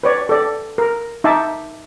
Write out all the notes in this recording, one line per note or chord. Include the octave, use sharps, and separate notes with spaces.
B4 C#5 D5
A4 D5
A#4
D#4 E5 A5 D6